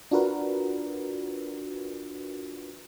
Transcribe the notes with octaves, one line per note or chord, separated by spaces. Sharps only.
D4 F4 F#4 A#4 B4